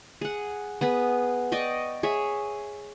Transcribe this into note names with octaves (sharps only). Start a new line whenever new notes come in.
G#4 F#5
B3 G#4 B4
D5 D#5 G5 C#6
G#4 C#5 E5